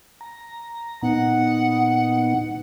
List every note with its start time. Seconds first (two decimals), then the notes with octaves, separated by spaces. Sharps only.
0.21 A#5
1.02 A#2 B3 D#4 F#5